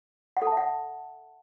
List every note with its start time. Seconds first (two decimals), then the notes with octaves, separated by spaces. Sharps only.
0.37 F#5
0.42 A4
0.47 A5
0.52 E5
0.57 F#5